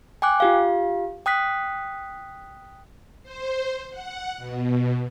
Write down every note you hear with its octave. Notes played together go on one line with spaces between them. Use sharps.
G5 G#5 D6 F#6
F4 G4 F5
G5 D#6 F#6 B6
C5
F#5
B2